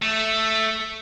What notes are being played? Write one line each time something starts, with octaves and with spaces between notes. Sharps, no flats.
A3